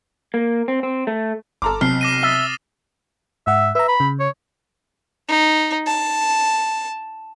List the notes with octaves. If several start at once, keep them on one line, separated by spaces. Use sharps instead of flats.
A#3
C4
C4
A3
G1 A4 A#5 C6 D6 F6
B1 C3 C4 A5 F6 C7
D6 A#6 D#7
E5 D#6 A6 G7
G#2 E5 F#5
B4 E5 A#5
B5
C#3
C#5
D#4
A5